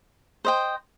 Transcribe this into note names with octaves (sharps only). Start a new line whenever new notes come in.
C5 D#5 G5